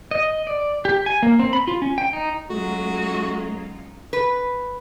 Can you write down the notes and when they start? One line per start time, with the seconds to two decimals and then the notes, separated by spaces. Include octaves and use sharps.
0.11 D#5
0.47 D5
0.85 G4
1.06 G#5
1.23 A#3
1.39 C4
1.53 B5
1.68 F4
1.82 C#4
1.98 G5
2.13 D#4
2.50 F#3 G#3 A3 C#4 D#4 F4 F#4
4.13 B4